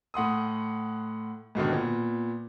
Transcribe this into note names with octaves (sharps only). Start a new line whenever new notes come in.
A2 F#5 C6 D#6
G#2 B2 D3 D#3
A#2 B3